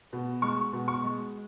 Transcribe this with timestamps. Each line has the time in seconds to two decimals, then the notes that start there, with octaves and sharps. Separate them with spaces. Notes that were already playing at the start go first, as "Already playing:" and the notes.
0.13 B2
0.42 G#3 C#6
0.73 B2
0.88 C#6
1.03 G#3